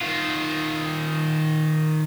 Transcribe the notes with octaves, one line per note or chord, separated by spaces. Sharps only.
D#3 F4